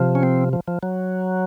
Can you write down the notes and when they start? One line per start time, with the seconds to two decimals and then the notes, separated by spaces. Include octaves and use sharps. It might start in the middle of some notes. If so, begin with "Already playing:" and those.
Already playing: C3 F3
0.15 C#4
0.23 C4
0.53 F3
0.68 F3
0.83 F#3